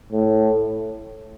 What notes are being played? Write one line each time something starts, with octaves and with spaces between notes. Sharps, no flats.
A2